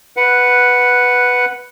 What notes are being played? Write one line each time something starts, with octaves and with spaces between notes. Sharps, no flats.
B4 F#5